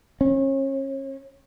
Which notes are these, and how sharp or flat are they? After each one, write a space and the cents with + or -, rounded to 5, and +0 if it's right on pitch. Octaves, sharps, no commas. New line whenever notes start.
C#4 -35